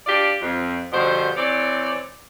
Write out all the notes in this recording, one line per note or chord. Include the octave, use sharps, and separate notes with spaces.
D4 F4 G4 D5
F2
G2 B2 D3 F3 C5
E3 C4 C#5 D5